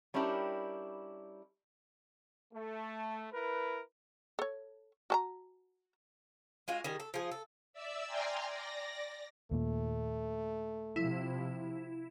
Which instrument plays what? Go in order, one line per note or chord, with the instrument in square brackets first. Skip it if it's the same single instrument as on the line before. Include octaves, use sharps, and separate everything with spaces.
[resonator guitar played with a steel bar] G3 C#4 D4 E4 G4 A#4
[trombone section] A3
E4 A#4 B4
[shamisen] A4 C#5
F#4 A5 A#5
[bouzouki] G#3 F4 F#4
D#3 G3 G#4
A4
F3 G#4
A4
[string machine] D5 E5 E6
D5 G5 G#5 A#5 C6 F6
D5 A#6
[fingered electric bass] D#2 A#2 [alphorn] A3
[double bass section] C3 F3 [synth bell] E4